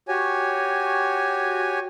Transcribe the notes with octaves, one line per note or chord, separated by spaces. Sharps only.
F#4 G4 C#5 G#5